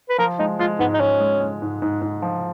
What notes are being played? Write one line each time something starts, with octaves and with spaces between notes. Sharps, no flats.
B4
F3 A#4
G#3 D#4
G#3 F4
G#2 B3
D#4
G#2 C#4
G#3
G#3
G#2
G#2
G#2
F3